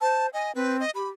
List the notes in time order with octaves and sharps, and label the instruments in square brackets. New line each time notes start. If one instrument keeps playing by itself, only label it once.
[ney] C5 [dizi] A5
[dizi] D#5 [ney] G#5
[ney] C4 [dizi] B4
[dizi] D#5
[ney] G4 [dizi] B5